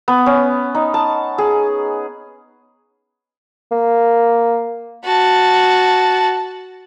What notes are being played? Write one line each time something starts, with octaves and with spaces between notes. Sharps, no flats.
B3
C#4
D#4
A5
G#4
A#3
F#4 A5